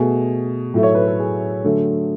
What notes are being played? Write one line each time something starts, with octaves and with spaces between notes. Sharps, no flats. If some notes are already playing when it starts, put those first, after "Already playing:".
Already playing: B2 A3 G#4
A2 F#3 A3
C#5
B4
A4
G#4
D3 F#3 A3